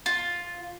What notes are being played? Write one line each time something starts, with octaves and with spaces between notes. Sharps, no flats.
F4